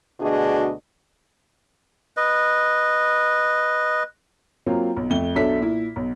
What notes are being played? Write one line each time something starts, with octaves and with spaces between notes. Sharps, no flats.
D2 B2 D4 F#4 G#4 D#5
B4 D#5
F#3 A#3 C4 F4
B1
F2 A3 G7
B1 F#3 D4 A4 E5 B6
A#2 E4
B1